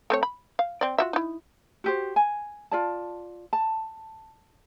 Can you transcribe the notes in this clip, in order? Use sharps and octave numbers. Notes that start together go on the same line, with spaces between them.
A3 C4 C#5
B5
F5
C4 D5
F4 F#4 E5
D#4 E4
F#4 G4 C5
G#5
F4 D5 A5
A5